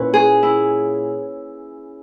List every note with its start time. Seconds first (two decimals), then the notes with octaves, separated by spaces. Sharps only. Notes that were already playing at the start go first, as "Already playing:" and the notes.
Already playing: A#2 C#4 E4 B4 C#5
0.14 G#4
0.43 E4